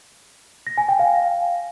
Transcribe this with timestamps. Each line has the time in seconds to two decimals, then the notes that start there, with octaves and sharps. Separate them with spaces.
0.67 A#6
0.78 G#5
0.88 G5
0.99 F5